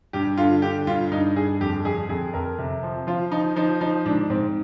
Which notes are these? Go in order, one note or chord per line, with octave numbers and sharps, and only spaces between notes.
G2 G4
D3 F4
D3 G4
G2 F4
G2 D#4
G2 G#4
F2 G4
F2 G#4
F2 G#4
F2 A#4
C3
F3
F3 F4
F3 D#4
F3 D#4
F3 D#4
G#2 D4
G#2 C4